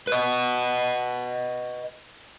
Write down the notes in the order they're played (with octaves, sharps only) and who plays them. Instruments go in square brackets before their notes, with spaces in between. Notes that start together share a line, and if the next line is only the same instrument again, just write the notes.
[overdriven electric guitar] B4 D#5